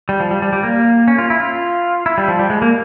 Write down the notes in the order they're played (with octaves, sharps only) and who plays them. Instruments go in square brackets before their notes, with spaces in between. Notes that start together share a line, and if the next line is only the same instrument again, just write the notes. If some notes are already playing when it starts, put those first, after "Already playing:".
[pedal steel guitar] G3
F3
G3
G3
G3
A#3
C#4
F4
E4
F4
E4
G3
F3
G3
G#3
A#3